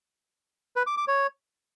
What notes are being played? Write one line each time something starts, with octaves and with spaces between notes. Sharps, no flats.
B4
D6
D6
C#5